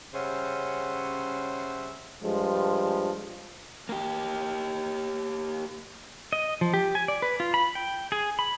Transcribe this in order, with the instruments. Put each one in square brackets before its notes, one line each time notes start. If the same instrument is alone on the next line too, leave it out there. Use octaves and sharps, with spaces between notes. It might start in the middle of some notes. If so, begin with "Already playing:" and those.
[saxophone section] C#3 G3 C#4 C5 E5 F#5
[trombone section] G2 F3 G#3
[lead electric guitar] A#3 G4
[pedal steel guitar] D#5
F3
G4
G#5
D5
B4
F4
B5
G5
G#4
B5